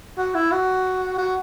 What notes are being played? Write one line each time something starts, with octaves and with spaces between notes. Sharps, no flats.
F#4
E4
F#4
F#4